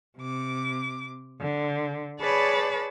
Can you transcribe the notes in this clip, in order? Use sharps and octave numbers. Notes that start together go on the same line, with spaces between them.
C3 D6
D3
G#4 B4 C#5 D5 A5 B5